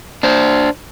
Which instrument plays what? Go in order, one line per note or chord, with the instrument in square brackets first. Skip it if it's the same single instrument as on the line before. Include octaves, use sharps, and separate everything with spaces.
[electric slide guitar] D4 C5